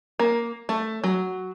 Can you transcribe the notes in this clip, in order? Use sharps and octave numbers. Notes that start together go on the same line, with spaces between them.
A#3
A3
F#3